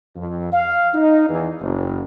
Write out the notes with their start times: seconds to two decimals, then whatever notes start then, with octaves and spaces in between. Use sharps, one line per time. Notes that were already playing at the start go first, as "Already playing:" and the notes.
0.16 F2
0.53 F5
0.95 D#4
1.29 E2
1.61 F#1